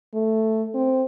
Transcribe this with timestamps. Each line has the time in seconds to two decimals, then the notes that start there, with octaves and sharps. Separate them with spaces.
0.14 A3
0.74 C4